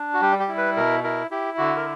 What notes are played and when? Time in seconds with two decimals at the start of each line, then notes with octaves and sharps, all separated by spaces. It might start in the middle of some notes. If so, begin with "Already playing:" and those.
Already playing: D4
0.14 F#4
0.22 G3 G4
0.40 G4
0.48 E4
0.58 B4
0.77 B2 A#4
1.04 E4 A#4
1.31 E4 G4
1.58 D3 F#4
1.76 A#4